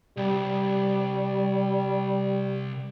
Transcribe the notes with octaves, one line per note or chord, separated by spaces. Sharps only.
C2 G3